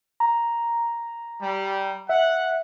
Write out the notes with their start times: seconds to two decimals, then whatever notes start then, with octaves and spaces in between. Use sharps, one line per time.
0.20 A#5
1.42 G3
2.09 E5 F#5